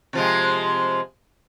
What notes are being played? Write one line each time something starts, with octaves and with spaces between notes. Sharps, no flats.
C3 F3 G#3